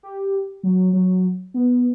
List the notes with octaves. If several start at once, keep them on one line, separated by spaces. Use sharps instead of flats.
G4
F#3
F#3
B3